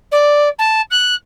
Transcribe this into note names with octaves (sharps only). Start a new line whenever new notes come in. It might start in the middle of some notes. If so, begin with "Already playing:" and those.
D5
A5
F#6